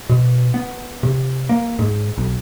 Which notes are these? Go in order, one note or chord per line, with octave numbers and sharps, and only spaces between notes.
B2
B3
C3
A#3
G#2
B1